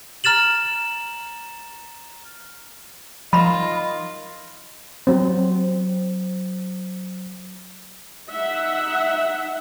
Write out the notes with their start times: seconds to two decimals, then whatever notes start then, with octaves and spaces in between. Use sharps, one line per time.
0.24 A#5 F6 A6 E7 F#7
3.33 F3 D#4 F4 A#4 D#5 B5 E7
5.07 F#3 C4 C5
8.32 D#4 E5 F#5